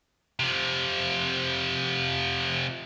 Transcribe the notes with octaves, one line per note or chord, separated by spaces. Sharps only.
C3 F3